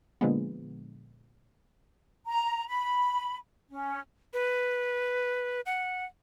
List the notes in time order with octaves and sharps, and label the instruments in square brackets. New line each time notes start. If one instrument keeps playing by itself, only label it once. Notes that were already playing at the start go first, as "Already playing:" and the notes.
[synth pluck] A#2 D3 F3 G#3 B3
[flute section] A#5
B5
C#4
[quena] B4
F#5